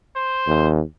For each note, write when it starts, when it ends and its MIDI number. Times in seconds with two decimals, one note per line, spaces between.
0.16 0.70 72
0.47 0.82 39